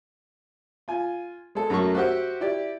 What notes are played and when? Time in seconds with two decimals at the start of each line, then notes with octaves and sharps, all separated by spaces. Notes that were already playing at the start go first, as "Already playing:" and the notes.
0.88 F4 G#5
1.55 G#3 A4
1.70 F#2 F#3 A3 A5 C#6
1.94 F#4 G4 C5 E5 F#5
2.41 E4 G4 D5